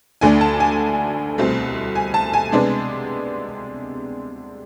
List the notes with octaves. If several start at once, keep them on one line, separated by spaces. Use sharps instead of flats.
D2 D3 A3 D4 G#5
A5
G#5
C2 B2 A3 C4
G#5
A5
G#5
C3 G#3 B3 D4